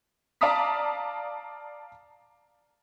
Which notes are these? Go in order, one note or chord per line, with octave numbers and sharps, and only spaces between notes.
D5 F5 A5 A#5 D#6 B6